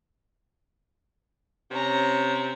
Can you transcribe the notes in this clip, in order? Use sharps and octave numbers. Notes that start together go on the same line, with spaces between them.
C3 C#4 A#5